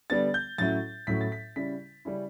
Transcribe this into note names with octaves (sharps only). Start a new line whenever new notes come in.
D3 G3 B3 D4 A6
G6
A2 F#3 C#4 E4 A6
A2 F#3 C#4 E4 B6
A6
B6
C#3 G3 C#4 E4 B6
C#3 G3 C#4 E4